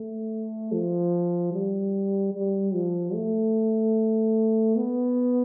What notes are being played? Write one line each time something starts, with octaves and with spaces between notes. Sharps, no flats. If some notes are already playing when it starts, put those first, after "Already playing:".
Already playing: A3
F3
G3
G3
F3
A3
B3